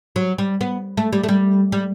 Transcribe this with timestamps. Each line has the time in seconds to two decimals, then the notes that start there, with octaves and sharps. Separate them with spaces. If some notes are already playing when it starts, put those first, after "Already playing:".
0.16 F#3
0.38 G3
0.61 B3
0.97 A3
1.13 G3
1.23 A3
1.29 G3
1.72 G3